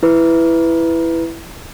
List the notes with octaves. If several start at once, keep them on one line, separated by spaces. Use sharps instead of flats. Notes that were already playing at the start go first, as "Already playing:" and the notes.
E4 B4